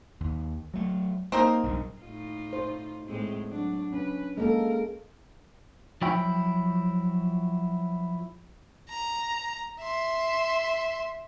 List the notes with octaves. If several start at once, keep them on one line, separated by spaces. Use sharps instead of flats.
D#2
F#3 A3
A3 A#3 C4 D#4 A#4
B1 G2 C#3
A2 D#4 F4
C5
A2 G#3 C4
F#3 D4
C#4 B4
G#3 A#3 A4 A#4
F3 F#3 E4 G5
A#5
E5 C6